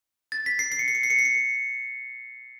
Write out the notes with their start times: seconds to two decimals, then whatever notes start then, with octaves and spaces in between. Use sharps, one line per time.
0.32 A6
0.46 B6
0.59 C7
0.72 C7
0.79 C#7
0.88 C7
0.95 C#7
1.03 C7
1.10 C#7
1.19 C7
1.25 C#7